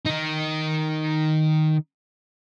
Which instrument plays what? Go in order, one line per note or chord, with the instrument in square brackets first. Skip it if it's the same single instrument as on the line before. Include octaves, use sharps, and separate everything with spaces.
[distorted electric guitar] D#3 D#4